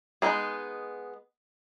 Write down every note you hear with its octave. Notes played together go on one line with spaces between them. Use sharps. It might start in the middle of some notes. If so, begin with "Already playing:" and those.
G#3 B3 D#4 E4 G#4